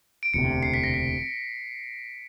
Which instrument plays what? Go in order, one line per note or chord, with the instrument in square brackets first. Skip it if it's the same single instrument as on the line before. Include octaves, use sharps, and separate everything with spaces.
[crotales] D7
[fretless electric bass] E1 D2 C3 [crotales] C#7
[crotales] C7
B6
A#6
B6